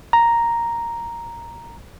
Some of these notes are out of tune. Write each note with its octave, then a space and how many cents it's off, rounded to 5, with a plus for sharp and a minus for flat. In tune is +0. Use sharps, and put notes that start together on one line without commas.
A#5 +0